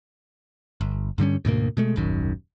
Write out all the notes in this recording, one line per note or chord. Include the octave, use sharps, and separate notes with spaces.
G1
G2 D3 G3 C#4
D2 G#2 B2 A#3
B2 G#3 A3
D#1 G#1 F#2 D#3